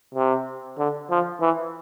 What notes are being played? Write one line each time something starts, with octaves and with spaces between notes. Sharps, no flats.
C3
D3
F3
E3